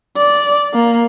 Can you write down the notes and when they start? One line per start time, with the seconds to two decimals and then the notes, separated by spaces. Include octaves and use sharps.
0.17 D5
0.74 A#3